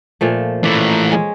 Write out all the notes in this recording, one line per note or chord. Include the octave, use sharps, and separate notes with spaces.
A#2 F3 A3
E3 A3 D5
G#3 C#4